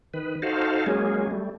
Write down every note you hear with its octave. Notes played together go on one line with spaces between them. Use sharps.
D#3 B4
D#4 F#4 A4 C5 F5
F#3 G#3 A#3 C#4 G#4
G3 A3